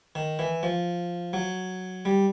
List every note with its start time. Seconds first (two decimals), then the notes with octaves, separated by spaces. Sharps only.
0.15 D#3
0.39 E3
0.63 F3
1.33 F#3
2.05 G3